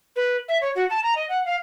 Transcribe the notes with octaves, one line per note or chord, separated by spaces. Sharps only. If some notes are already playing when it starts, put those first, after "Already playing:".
B4
E5
C#5
F#4
A5
A#5
D#5
F#5
F5